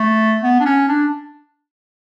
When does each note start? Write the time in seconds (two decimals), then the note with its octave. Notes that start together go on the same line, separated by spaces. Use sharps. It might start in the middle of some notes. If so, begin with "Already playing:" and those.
Already playing: A3
0.43 B3
0.60 D4
0.65 C#4
0.88 D4